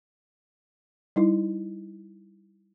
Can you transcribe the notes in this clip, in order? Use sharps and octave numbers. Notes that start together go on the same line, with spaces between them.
G3 D#4 E4